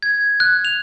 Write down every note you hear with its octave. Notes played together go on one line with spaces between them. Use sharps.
G#6
F#6
F7